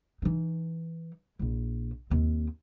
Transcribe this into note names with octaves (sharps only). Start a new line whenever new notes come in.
E3 D#4
A#1 E4
D#2 C4